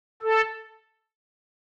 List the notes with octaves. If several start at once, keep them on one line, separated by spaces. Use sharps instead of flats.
A4